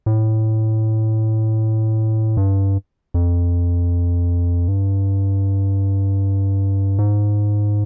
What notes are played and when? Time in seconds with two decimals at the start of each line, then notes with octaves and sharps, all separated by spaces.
0.06 A2
2.37 G2
3.14 F2
4.68 G2
6.99 G#2